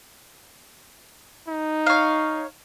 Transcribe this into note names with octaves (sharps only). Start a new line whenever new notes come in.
D#4
C#5 F5